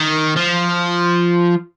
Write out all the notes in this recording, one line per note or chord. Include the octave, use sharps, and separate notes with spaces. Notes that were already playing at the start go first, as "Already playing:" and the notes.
Already playing: D#3
F3